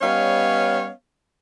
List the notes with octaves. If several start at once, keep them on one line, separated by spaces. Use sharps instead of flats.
G3 B3 C#4 C#5 D#5 F5